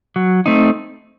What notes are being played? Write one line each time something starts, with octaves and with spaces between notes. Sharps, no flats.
F#3
A3 C4 D#4